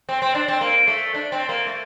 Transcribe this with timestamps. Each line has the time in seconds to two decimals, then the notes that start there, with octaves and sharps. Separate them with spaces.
0.09 C4
0.22 C4
0.35 D4
0.48 C4
0.61 A#3
0.87 A3
1.14 D4
1.32 C4
1.49 A#3
1.67 A3